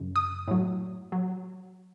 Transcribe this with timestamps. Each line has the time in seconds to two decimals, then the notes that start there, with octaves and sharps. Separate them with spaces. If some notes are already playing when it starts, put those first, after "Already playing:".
Already playing: F#2 C#3
0.16 D#6
0.48 A2 F#3
1.12 F#3